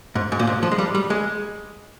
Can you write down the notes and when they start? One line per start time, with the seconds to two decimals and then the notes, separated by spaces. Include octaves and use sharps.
0.15 G#2
0.32 G#2
0.39 A#2
0.47 G#2
0.63 F3
0.71 G#3
0.78 G3
0.95 G3
1.10 G#3